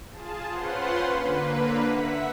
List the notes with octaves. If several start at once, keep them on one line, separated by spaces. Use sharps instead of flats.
F4 G#4 A5
C#4 F4 B4 C5 F#5 C6
D3 A#3 B4
E5 F#5 B6